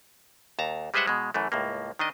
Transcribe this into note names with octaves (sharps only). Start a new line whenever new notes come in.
D#2 A5 A#5
G3 G#3 B4 C5 E5 F#5
B2 G#3
F#2 E3 A3
C#2 A2 A#3
D#3 D4 D#5